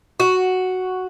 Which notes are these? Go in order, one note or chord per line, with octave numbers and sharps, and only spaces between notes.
F#4